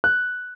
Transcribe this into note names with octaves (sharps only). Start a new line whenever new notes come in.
F#6